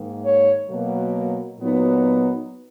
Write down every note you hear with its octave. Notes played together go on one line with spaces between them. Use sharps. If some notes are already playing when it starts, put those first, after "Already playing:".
Already playing: G#2 D#3 A#3
C#5
B2 F#3 A#3
A#2 F#3 B3 D#4